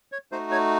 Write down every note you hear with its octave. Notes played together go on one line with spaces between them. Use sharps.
C#5
A3 D#4 F#4 C5
C#5